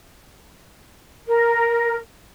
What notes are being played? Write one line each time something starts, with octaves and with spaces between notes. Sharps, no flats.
A#4